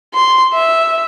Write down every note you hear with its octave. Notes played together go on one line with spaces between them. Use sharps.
C6
E5